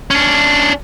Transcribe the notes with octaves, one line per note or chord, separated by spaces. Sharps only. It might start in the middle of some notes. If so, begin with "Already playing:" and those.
C#4 D4